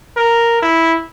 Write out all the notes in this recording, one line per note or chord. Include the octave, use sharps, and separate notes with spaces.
A#4
E4